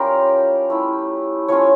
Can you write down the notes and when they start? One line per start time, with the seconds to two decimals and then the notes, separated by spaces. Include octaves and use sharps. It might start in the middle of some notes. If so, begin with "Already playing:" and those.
Already playing: G3 C#4 F4 G4 A#4
0.70 A3 E4
1.48 F3 A3 C#4 F4 C#5